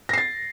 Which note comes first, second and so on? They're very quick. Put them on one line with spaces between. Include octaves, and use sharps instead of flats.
A#6 C7 A6